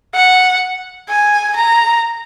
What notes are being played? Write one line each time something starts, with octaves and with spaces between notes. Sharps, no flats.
F#5
G#5
A#5